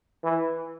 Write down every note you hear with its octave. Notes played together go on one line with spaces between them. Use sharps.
E3